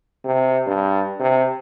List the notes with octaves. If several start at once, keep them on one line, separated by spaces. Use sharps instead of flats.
C3
G2
C3